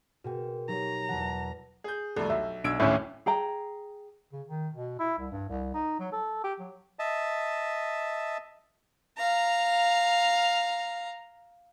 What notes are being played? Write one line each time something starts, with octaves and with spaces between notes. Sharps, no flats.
B2 F#4 G#4 A#4 G5 E7
F#3 D#4 G4 C#5 A#5
E2 E3 F#5 A5
G#4 G6
C2 F2 A3 A4
B1 E5
B1 D4 E6 G#6 D7
D1 G#1 C#2 A2 C#4 E5
G#4 G5 A#5
C#3
D#3
B2
E4
C2
G2
C2
D#4
F#3
A4
G4
F#3
D#5 E5 A5
F5 A#5